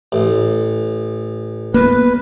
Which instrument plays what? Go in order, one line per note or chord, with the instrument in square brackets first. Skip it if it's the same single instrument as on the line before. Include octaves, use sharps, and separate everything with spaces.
[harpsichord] A1
[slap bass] A#3 B3 [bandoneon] B4